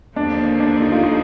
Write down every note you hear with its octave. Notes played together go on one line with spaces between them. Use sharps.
D#2 D3 F3 D4
A#3
D4
D#4
F4
D#4